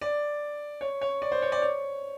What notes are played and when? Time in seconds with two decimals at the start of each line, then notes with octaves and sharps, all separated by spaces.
0.01 D5
0.81 C#5
1.01 C#5
1.22 D5
1.32 C5
1.42 C#5
1.52 D5
1.62 C#5